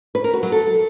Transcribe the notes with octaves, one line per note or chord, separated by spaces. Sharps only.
B4
A#4
F#4
F#3
A4